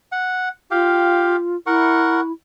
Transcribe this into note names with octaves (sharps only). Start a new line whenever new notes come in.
F#5
F4 G4 F5 G5
E4 A#4 F#5 C#6